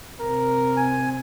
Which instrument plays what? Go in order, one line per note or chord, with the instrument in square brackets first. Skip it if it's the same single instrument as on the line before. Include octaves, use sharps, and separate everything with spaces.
[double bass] C3 [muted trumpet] A#4
[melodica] G#5